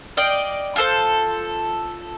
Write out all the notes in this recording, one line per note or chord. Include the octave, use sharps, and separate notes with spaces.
D5 D#5 F5 G5
F4 G#4 A4 C5